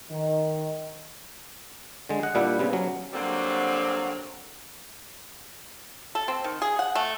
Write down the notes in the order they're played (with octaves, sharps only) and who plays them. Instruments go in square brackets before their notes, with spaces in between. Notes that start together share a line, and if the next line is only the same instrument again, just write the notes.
[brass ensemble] D#3
[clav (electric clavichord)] D3 G#3
D#5 F#5
A#2 G3 D4 E4 G4 F#5
C#3 G3 B3 C4
F#3 C#4
[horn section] D3 F#3 G3 A#3 C4
[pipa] A4
C4
D#3
G#4
F#5
A3